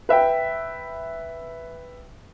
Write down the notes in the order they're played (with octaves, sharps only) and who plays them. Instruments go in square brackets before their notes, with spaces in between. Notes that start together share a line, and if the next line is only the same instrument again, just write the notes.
[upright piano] B4 E5 G5